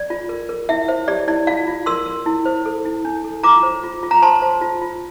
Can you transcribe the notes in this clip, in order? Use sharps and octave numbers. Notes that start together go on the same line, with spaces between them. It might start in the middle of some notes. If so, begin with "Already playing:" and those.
Already playing: D5
F4
A#4
A#4
E4 E5
C5 E5
G4 D5
E4 D5
F4 D5 F5
F4
A#4 C6 E6
A#4
E4
C5
A4
E4
D4
A4
F4 A#5 D6
C5
F4
F4
A#5
C5 A5 C6
C5
F4
F4